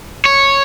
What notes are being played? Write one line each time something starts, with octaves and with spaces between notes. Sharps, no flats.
C#5